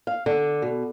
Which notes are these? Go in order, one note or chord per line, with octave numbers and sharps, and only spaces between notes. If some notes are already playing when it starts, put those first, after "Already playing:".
F5
D3
B2